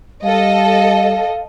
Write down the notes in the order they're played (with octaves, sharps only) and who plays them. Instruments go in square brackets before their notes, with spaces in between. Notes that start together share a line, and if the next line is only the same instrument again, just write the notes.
[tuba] G3 [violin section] A4 D#5 [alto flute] F5